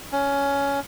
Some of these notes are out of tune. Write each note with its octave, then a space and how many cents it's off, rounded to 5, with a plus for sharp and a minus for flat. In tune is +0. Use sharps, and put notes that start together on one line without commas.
C#4 +15